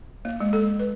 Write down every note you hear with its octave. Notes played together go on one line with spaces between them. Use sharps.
A#3
G#3
A4
B4